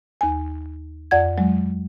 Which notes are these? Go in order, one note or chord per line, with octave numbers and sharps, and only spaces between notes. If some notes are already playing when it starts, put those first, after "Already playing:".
D#2 G#5
F2 D5 F#5 G#6
F#3 G#3